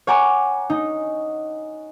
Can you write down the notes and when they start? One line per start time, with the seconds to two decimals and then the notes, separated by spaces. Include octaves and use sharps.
0.07 C#5 F#5 G#5 A#5 D6
0.70 D#4